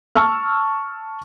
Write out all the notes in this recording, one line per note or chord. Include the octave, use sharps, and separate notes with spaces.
A5 C#6 E6 F6